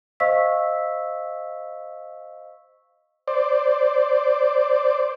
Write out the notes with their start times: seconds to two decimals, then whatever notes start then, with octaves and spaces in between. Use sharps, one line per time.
0.20 C5 D#5 F5 C#6 E6 B6
3.28 C5 D5